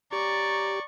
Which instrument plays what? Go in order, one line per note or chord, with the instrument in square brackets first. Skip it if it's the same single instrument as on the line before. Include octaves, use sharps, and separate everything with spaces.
[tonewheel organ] G4 [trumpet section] C#5 A#5 [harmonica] D5 [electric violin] C#6